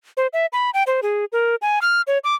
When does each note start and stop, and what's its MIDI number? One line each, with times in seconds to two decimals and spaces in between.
0.17 0.27 72
0.33 0.46 76
0.53 0.70 83
0.74 0.83 79
0.87 1.01 72
1.03 1.25 68
1.32 1.56 70
1.62 1.79 80
1.82 2.02 89
2.07 2.18 73
2.24 2.35 86